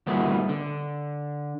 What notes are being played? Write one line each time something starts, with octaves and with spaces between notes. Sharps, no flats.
D2 G2 A#2 D#3 A3 B3
D3